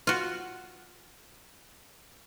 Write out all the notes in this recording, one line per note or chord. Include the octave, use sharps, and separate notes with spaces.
F4 F#4